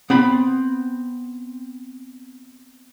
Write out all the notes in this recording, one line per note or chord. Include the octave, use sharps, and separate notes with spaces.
B3 C4 B5